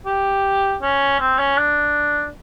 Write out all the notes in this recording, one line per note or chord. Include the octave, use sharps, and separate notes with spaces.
G4
C#4
C4
C#4
D4